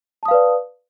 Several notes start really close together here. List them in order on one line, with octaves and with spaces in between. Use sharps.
A5 D#6 F5 B4 D5